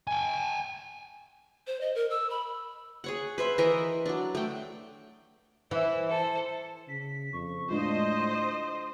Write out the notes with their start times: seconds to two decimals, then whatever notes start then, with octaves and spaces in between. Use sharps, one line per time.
0.07 G5 G#5
1.67 C5
1.81 D#5
1.95 A#4
2.10 E6
2.30 B5
3.04 G#4 C#5 F#5
3.38 B4 C5 E5
3.58 E3 A#4 D#5 E5
4.06 F#3 D4
4.35 A3 G5
5.71 E3 E4
6.09 A4 C5
6.88 C#3 B6
7.33 F2 C#6
7.70 A2 G#3 D4 F4 C5 D#5
8.12 C6